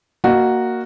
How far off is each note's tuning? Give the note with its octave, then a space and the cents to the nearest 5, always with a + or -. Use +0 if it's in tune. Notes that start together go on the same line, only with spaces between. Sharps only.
A#3 +0 F#4 +0 D#5 -25